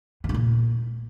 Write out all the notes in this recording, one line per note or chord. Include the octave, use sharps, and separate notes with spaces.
B2
G#2
A#2